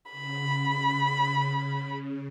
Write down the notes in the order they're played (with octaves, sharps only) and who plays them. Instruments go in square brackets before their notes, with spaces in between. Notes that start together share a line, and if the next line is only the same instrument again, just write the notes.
[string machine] C#3 [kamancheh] B5